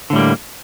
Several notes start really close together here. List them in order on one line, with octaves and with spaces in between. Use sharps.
D3 A2 G3 A#3